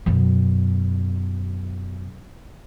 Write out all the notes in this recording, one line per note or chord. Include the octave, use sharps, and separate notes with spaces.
F#2 B2